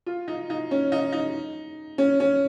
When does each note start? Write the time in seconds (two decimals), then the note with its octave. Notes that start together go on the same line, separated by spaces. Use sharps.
0.06 F4
0.28 D#4
0.50 D#4
0.71 C#4
0.92 D#4
1.13 D#4
1.98 C#4
2.20 C#4